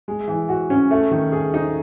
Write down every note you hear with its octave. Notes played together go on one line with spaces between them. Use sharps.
G#3
E3
F#4
C#4
A3
D#3
G#4
D#4